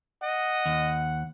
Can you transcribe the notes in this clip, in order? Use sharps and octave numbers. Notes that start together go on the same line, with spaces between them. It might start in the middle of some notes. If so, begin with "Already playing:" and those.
D#5 F#5
D#2